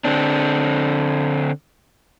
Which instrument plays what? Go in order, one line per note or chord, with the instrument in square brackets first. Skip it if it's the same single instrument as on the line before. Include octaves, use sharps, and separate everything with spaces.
[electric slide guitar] D3 C4 D4